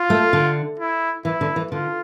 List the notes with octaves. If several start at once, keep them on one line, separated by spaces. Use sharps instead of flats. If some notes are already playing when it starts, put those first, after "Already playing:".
Already playing: F4
A3
D3
E4
E3 E4
D3
E3
D3 F4